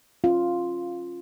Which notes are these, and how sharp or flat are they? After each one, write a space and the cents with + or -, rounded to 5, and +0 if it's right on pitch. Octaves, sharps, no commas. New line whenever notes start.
C#4 -30 F4 +0